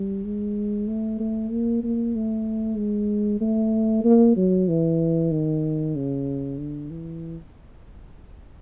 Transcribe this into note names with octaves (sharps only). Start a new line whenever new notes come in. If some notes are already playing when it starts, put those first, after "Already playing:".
Already playing: G3
G#3
A3
A3
A#3
A#3
A3
G#3
A3
A#3
F#3
E3
D#3
C#3
D3
E3